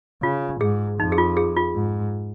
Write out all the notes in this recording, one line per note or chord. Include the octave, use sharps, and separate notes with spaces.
C#3 F4
G#2 G#4
F2 D#4
G#4
F4
G#4
F4
G#2